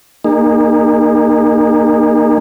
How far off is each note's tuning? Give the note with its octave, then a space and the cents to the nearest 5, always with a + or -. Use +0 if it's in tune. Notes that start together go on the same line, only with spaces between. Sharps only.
A#3 +0 D#4 -30 G#4 -35